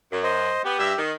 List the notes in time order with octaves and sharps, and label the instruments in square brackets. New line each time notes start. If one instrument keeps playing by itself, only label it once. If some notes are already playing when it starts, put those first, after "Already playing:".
[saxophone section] F#2
[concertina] C5 D#5
[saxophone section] B3 [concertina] G4
[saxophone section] G2 E5
D#3